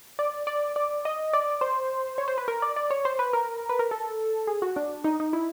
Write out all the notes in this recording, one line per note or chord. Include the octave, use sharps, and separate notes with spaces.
D5
D5
D5
D#5
D5
C5
C#5
C5
B4
A#4
D5
D5
C#5
C5
B4
A#4
B4
A#4
A4
G#4
F#4
D4
D#4
D#4
E4